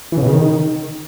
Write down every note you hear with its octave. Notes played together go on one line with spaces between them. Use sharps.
E3
C#3
B2
C#3
D#3